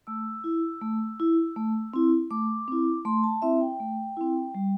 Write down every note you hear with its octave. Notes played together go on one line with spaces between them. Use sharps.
A3 E6
E4
A3
E4
A3
C4 E4
A3 D6
C4 E4
A3 C6
A5
C4 E4 E5
G5
A3
C4 E4
G3